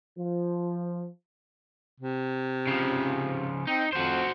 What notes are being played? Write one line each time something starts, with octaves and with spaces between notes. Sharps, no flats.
F3
C3
C#3 F3
C4 D#4
F2 F#4 C5